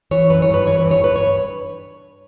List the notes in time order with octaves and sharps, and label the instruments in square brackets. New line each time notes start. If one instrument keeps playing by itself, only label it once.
[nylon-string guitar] E3 C#5
F#2 B4
C#5
G2
B4
E3 C#5
B4
G2
C#5
G2 B4
C#5